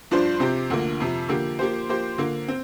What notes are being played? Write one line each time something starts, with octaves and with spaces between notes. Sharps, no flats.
G2 F3 D4 F4 C5
C3 F3 C4 G4
D2 D3 F3 A#3
F2 C3 F3
D3 F3 A#3 G4
F3 A#3 G4 C5
F3 A#3 G4 C5
D3 A#3 F4
C4